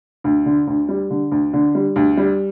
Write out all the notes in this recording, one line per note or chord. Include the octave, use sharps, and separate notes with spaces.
D2
D3
D2
G3
D3
D2
D3
G3
D2
G3